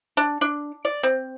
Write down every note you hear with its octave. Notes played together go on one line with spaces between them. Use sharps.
D4
D4
D5
C4